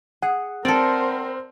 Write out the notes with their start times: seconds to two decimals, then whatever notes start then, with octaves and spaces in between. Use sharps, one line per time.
0.22 G#4 F#5
0.65 C4 A4 A#4 C5 D5